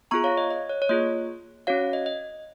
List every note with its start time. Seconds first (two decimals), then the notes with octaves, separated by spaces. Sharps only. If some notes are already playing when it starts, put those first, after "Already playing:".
0.11 B3 F4 G#4 A#5 C#6
0.24 C#5 F5
0.37 D#5
0.50 D#5
0.69 C#5
0.82 C#5
0.89 A#3 F4 G#4 D#5
1.67 C#4 F#4 C#5 F5
1.93 D#5
2.06 D#5